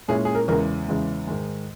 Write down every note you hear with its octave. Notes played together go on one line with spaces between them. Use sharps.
A#2 G#3 C#4 E4 G#4
G#4
A#4
E2 C#3 G#3 A#4
E2 C#3 G#3
G#2 D#3 G#3